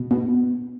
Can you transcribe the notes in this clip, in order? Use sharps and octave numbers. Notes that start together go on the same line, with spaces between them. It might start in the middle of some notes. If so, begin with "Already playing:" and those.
Already playing: B2
B2